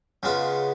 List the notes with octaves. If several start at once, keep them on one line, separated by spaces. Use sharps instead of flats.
C#3 G#3 B3 F4